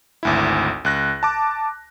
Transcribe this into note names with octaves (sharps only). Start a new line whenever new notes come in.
G#1 D2 E4
C#2 F#6 A#6
A5 D6